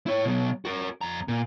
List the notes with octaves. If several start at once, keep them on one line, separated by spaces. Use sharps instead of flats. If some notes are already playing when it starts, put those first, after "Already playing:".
E4 C#5
B2 F#3
F#4 A#4
F2 A#5
A#2